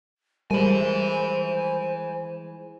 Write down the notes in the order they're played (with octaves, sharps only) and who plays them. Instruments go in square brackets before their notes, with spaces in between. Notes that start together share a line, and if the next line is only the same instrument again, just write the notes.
[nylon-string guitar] E3 G#3 A#4 [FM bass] G3 [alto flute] C5 [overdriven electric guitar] G#5 B5